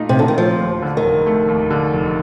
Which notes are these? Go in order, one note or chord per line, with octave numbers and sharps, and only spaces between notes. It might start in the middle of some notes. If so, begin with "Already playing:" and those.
Already playing: A#2 A3 D#4
C3
A#2 D3
D#3
F3 A3
D#2
D3
D#3
F1
A3
D#2
D3
F1